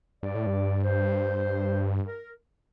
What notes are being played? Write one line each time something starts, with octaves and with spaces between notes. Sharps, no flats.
G2 D5
A2
G2
C5
A#4